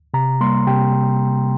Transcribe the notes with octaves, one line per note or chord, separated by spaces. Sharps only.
C3 A#5
G3 A#3 C6
C3 G5